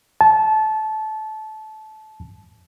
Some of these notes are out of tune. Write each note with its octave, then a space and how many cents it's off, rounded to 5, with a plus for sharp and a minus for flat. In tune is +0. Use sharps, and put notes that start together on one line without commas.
A5 -20